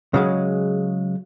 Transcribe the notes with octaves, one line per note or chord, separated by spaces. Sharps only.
C#3 F#3 G#3